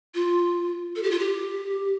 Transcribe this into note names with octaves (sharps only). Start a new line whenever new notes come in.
F4
A4
G4
F4
G4